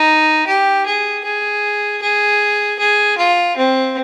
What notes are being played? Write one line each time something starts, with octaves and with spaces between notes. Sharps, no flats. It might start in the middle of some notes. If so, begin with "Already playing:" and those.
Already playing: D#4
G4
G#4
G#4
G#4
G#4
F4
C4